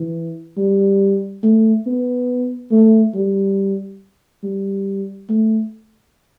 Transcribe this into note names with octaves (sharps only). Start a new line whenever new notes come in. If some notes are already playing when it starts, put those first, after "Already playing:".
Already playing: E3
G3
A3
B3
A3
G3
G3
A3